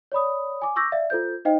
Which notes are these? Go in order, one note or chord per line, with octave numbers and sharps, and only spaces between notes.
C#5 D5 B5 D#6
G#5 D6
C#6 D6 E6 G6 A#6
D5 E5 F5
F4 A4 C5 G6
D#4 C5 D#5 F5 G5